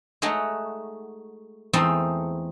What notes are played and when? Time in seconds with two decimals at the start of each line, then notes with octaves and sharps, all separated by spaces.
0.22 G#3 A3 D#4 F#4 C#5
1.73 E2 G#3 A3 C4 D#4 A4